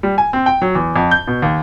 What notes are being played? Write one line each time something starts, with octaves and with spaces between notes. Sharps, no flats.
G3
G#5
C4
G5
F#3
E2
F2
G6
B2
D#2